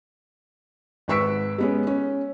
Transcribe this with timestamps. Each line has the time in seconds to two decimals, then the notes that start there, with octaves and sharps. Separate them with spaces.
1.08 G#1 B4 C#6 E6 B6 D7
1.58 G#3 B3 C#4
1.87 C#4